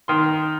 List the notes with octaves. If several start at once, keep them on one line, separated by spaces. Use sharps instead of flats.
D#3 C6